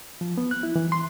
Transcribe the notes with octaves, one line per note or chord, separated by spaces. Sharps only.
F3
B3
F#6
E4
E3
C6